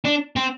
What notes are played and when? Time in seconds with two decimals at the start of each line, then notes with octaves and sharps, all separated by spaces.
0.05 D4
0.36 C4